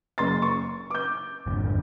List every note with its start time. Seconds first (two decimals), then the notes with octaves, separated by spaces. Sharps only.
0.18 F#1 C6 A6
0.42 C#6
0.90 D6 G6
1.47 G#1 F2 D3